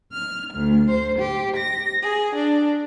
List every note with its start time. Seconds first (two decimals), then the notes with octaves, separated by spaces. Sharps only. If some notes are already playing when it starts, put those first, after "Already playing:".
0.12 F6
0.54 D2
0.89 C5
1.18 G4
1.56 A#6
2.02 G#4
2.34 D4